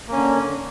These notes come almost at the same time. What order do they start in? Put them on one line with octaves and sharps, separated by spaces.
A#3 C#4 D3